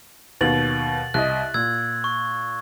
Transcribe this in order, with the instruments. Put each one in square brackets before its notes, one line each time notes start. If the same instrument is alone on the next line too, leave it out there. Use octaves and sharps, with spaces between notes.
[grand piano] D#2 B2 [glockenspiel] A6 F#7
[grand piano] C2 D#5 [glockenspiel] F#6
[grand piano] A#2 [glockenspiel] E6 G#6
[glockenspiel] C#6